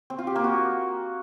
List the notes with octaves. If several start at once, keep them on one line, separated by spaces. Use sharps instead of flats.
C4
F4
G4
A#3
F#4